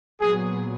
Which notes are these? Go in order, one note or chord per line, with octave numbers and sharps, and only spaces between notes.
A#2 F#3 B3 G#4